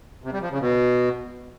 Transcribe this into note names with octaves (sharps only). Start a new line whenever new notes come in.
C3
G3
F3
C#3
B2